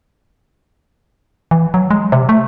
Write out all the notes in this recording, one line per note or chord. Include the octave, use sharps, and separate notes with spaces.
E3
F#3
G#3
C3
A3